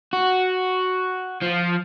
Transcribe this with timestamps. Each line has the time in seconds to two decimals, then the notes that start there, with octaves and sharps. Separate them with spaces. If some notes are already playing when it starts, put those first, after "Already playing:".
0.13 F#4
1.42 F3